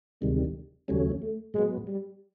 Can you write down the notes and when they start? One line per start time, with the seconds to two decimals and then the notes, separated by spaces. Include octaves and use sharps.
0.21 D2 C3 D#3 G3 G#3
0.88 D#2 C#3 F#3 G3 A3 C#4
1.21 A3
1.54 A2 F#3 G#3 B3
1.88 G3